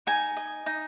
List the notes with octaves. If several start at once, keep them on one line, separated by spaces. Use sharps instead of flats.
D#4 G#5
D#5
D#4